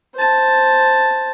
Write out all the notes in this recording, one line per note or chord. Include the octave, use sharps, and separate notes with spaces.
C5 A5